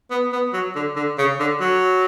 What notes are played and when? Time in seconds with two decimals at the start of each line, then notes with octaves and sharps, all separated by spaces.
0.11 B3
0.33 B3
0.53 F#3
0.76 D3
0.96 D3
1.18 C#3
1.40 D3
1.60 F#3